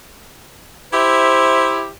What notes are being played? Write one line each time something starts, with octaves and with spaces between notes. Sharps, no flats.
E4 G4 C5 E5